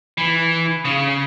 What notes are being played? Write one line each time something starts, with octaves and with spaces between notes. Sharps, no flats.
E3
C#3